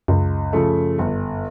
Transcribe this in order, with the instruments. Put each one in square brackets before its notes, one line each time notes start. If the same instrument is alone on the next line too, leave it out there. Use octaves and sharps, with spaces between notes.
[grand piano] C#2 [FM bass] F#2
[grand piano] C#3 F3 A3
G1